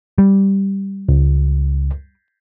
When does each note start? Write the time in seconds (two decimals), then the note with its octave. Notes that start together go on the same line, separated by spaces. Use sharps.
0.18 G3
1.09 C#2